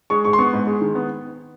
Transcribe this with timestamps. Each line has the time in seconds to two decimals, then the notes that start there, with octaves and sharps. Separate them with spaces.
0.10 G#3 C#6
0.25 G#2 C#6
0.33 C6
0.38 B3 C#6
0.53 G#2
0.67 G#3
0.81 D#3
0.95 B3